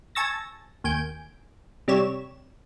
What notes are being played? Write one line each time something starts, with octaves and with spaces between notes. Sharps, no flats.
G#5 A5 C#6 E6 A6 A#6
D#2 G#5 G6 D7
C3 G3 C#5 E7